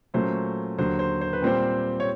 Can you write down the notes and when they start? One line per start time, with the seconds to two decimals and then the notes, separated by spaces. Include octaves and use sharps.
0.14 A#2 F#3 A3 C#4 C5
0.78 D#2 D3 F#3 C5
0.99 C5
1.21 C5
1.33 B4
1.42 A#2 G3 C4 C5
2.00 C#5